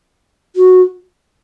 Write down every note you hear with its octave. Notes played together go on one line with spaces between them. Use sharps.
F#4